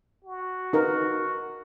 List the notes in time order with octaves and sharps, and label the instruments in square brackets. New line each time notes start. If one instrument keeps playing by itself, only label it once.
[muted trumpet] F#4
[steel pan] D#4 A#4 B4